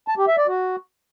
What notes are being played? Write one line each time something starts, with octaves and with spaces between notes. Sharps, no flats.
A5
G4
E5
D5
F#4